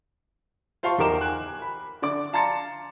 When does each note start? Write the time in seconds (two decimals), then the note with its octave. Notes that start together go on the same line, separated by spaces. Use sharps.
0.83 F4 C5 F5 A5 C6 C#6
0.98 E2 D#4 G4 A#4 D6 E7
1.21 G#5 F#6
1.62 B5
2.02 D3 D5 D6
2.33 F5 A5 A#5 C6 A6 C#7